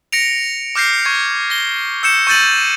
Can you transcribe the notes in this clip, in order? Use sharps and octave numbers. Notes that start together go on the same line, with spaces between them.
A#6 C#7 D7 F7
D6 F6 G6 A#6 C7
C#6 G#6
A#6 G7
E6 G6 C#7 E7
C#6 E6 G6 A6 D#7 F#7